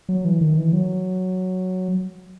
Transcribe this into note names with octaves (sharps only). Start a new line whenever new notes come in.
F#3
E3
D#3
E3
F#3